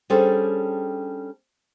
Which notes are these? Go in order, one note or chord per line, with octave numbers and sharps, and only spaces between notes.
G3 C#4 D4 G#4 A4 C5